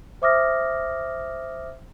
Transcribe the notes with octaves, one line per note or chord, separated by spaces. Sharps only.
C5 E5 D6 D#6 F6 A#6